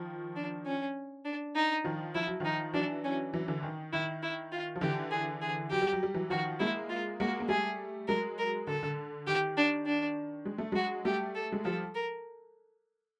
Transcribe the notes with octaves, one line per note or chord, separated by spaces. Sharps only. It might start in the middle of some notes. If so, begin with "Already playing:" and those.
Already playing: D#3 F3
D4
C#4
D4
D#4
D#3 F3
F3 E4
F#3
D#3 F3 D#4
E3 F#3 D4
C#4
E3 F#3
D3 E3
D#3
D#3 E4
E4
F4
F3
D3 E3 G4
G#4
G#4
F#3 G4
G3
F#3
G3
E3 F#3
D#3 F3 F#4
G#3 A#3 E4
F4
G#3 A#3 F#4
A#3
G3 A3 G#4
F#3 G#3 A#4
A#4
D3 A4
D3
D#3 G4
D4
D4
G#3
A3
F#3 G#3 F#4
G3 A3 G4
A4
G#3
F3 G3 A4
A#4